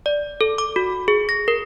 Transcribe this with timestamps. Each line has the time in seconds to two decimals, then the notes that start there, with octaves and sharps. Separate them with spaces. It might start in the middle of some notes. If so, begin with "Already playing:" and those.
0.06 D5
0.41 A4
0.58 D6
0.76 F#4
1.08 G#4
1.29 A#6
1.48 A#4